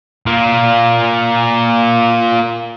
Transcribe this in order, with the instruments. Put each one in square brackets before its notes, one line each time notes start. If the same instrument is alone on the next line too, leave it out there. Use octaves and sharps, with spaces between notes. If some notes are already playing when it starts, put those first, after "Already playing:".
[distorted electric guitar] A#3 F4